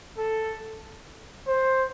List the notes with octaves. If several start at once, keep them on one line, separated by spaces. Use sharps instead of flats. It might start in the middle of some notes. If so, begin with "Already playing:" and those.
A4
C5